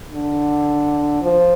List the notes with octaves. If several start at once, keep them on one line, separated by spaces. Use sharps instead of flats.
D3
F3